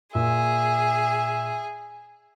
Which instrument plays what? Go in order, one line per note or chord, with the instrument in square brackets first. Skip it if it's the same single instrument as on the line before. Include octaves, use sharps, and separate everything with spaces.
[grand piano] A#2 [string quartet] G#4 [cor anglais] E5